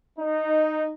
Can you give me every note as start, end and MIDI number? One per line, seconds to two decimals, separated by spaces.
0.17 0.91 63